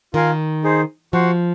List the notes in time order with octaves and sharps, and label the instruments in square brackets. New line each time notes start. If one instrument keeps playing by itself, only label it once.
[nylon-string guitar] D#3 [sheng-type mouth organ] F4 A#4 F5 G#5
[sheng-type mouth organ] D#4 G#4 C5
[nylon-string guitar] F3 [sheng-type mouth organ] F#4 C5 F#5